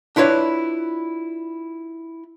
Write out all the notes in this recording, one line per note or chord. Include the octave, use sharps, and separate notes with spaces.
D4 E4 F4 B4 C#5 D5